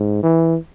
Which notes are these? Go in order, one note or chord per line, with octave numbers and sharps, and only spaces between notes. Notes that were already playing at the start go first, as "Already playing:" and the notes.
Already playing: G#2
E3